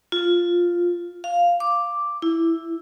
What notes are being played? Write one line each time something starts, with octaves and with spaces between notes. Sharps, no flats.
F4
F5
D6
E4